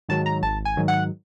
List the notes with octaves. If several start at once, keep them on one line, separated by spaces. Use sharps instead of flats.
G#2 D#3 F#3 A5
A#5
G#1 A5
G#5
G#2 D#3 F#3
F#5